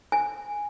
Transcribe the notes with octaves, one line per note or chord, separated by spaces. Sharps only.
G#5